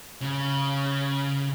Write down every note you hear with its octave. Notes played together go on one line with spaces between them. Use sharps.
C#3